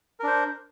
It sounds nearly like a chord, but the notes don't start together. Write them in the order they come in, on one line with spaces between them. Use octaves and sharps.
A#4 D4 C5